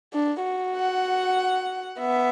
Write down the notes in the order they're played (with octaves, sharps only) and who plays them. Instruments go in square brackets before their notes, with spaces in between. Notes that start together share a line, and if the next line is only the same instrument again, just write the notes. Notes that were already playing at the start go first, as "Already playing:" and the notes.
[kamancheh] D4
F#4
[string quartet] F#5
[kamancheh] B3 [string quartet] E5